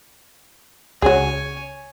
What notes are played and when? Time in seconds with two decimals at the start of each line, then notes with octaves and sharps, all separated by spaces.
1.02 C#2 C#4 F#4 G#4 C#5 G#5